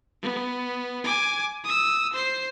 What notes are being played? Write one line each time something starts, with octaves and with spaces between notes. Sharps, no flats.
B3
G#5 D6
D#6 E6
C5 C7